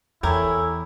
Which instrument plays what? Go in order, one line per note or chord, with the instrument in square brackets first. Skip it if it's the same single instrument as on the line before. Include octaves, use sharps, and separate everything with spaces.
[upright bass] E2 [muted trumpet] E4 [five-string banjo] G4 A#4 C#5 [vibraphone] A4 G#5